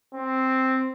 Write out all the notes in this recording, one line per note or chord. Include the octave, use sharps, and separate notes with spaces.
C4